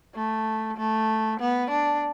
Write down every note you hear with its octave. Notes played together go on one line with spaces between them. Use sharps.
A3
A3
B3
D4